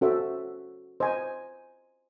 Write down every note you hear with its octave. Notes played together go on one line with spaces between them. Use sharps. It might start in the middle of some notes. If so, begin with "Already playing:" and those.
C#4 F#4 A4 C5 E5
C5 D#5 G#5